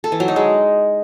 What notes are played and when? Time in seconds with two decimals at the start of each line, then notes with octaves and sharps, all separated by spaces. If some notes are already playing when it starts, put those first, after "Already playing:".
0.04 A4
0.12 E3
0.20 F#3
0.28 D#4
0.36 G#3